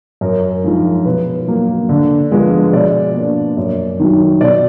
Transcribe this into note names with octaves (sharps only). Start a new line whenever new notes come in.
F#2 A#4
F3 G#3 D#4
B2 B4
F#3 A#3
D3
F3 G#3 B3
B2 D5
A#3 D4
F#2
D#3 F#3
B2 D5